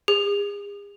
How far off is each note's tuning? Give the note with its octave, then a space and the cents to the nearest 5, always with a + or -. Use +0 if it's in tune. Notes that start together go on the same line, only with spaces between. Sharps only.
G#4 -40